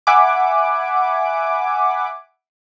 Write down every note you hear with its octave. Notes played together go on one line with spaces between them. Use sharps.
E5 F#5 G#5 B5 D6